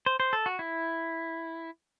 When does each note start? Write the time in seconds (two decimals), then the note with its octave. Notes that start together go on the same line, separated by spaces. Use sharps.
0.06 C5
0.20 C5
0.33 A4
0.46 F#4
0.59 E4